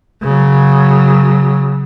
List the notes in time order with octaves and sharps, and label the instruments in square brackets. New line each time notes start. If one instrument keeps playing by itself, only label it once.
[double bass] C#3 F#3